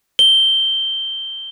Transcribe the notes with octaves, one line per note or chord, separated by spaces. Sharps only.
G7